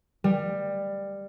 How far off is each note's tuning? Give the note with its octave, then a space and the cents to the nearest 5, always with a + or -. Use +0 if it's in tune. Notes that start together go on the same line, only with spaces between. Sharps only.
G3 +15